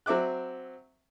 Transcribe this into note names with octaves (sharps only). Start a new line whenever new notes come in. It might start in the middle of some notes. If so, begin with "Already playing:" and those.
F#3 C4 E5 D6 F#6